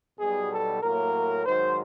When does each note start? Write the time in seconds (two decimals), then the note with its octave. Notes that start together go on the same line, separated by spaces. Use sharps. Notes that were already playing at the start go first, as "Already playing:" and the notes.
0.19 B1 B2 G3 G#4
0.50 A4
0.81 A2 F#3 A#3 A#4
1.45 G#2 D#3 F#3 C5